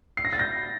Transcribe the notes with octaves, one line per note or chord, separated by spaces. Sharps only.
C7
A#6
A6
G6 A#6